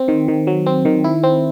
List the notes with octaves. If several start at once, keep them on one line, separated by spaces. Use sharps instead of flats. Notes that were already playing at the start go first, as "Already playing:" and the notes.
Already playing: C4
D#3
D#3
F#3
C4
D#3
E4
C4